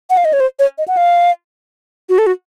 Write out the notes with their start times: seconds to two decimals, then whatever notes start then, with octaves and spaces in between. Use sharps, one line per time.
0.10 F#5
0.17 F5
0.25 D#5
0.33 C#5
0.40 C5
0.59 C#5
0.78 D#5
0.88 F#5
0.97 F5
2.09 F#4
2.18 A4
2.27 F#4